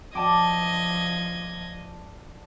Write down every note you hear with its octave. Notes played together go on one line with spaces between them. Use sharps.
F3 D5 D#5 A5 D6 G#6